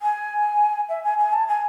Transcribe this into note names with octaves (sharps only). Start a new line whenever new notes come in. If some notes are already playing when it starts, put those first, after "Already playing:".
G#5
E5
G#5
G#5
A5
G#5